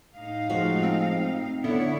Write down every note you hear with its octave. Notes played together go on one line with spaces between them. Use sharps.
A2 D#4 F5
F3 G#3 F#4
C4
D3 B3 E4 C#5 D5